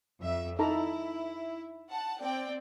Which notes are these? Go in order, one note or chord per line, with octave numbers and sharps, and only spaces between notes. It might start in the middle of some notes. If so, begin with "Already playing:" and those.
F2 E5
D#4 E4 A4 A#5
F#5 A5
C4 D5 G5